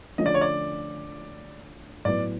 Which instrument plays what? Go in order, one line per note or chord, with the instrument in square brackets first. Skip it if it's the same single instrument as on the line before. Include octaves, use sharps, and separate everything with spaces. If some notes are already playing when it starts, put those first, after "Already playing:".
[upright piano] D3 F3 A3 C#4 [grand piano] D#5
[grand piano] D5
C#5
D5
[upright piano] A2 F#3 B3 [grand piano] D5